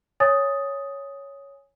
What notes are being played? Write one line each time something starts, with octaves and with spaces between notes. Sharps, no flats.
C#5 G#5 D#6 A6